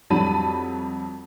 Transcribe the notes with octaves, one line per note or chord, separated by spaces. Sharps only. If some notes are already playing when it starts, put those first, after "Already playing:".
F2 F#3 G3 A5 B5 D#7